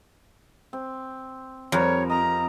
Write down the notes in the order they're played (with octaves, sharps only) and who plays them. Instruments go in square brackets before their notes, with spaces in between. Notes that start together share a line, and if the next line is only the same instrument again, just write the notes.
[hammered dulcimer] C4
[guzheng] F2 [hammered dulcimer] F3 G3 A#4 [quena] C#5
[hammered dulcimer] D#5 [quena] A#5